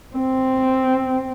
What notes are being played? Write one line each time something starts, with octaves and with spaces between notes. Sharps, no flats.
C4